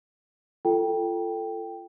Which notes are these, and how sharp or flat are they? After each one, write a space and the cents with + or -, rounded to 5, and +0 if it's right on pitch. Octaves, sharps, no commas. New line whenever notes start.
F4 -25 A4 +5 G5 +0